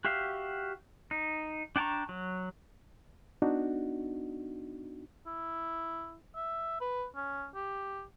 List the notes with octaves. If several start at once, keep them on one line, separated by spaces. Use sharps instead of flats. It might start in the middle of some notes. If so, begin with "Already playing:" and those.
F#4 G4 E5 F5
D#4
D4 G5 A5 A#5 C#6
F#3
B3 D4 D#4 F#4
E4
E5
B4
C#4
G4